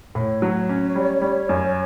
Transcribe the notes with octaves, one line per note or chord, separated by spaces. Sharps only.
A2 C#5
F#3
C#4
G3
G3
F#2